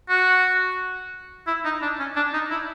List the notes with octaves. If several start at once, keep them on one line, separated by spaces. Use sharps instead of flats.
F#4
E4
D#4
D4
C#4
D4
D#4
E4